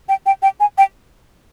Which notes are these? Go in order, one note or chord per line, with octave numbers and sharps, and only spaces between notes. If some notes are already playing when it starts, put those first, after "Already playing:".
G5
G5
G5
G#5
G5